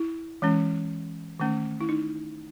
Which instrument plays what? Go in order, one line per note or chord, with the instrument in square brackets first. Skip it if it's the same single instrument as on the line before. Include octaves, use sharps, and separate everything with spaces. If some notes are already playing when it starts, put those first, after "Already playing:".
Already playing: [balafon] E4
E3 G#3 C#4
D#3 A3 C#4
E4
D#4